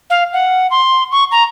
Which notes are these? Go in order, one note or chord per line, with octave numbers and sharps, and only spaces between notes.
F5
F#5
C6
C#6
A#5